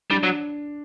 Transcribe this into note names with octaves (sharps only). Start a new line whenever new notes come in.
G3 D4
F#3